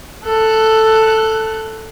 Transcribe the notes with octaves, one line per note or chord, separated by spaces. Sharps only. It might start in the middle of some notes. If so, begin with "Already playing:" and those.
A4 F#6